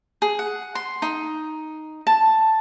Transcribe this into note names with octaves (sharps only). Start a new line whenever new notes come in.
G#4
F#5
C6
D#4
A5